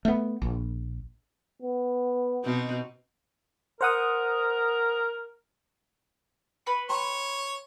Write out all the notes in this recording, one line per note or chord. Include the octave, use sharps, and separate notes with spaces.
A3 B3
A#1
B3
B2 C4 D#4
A#4 C5 F#5 D#6
B4 B5 C#6
C#5 G5 A#5 C6